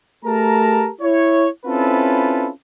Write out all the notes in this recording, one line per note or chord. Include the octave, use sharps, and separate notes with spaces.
A3 G4 G#4 A#4 A5 A#5
E4 C#5
C4 C#4 E4 F4 A4 B4